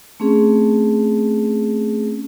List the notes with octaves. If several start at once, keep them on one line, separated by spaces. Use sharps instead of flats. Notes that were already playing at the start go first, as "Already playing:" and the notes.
A3 C4 C#4 G#4